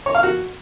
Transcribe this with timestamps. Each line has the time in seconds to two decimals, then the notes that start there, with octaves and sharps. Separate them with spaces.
0.06 C#5
0.15 F5
0.23 F#4